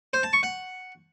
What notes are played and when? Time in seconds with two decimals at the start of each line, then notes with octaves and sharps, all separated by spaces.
0.13 C5
0.23 A5
0.33 C#6
0.43 F#5